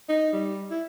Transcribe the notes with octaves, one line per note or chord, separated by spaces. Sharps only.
D#4
G3
E4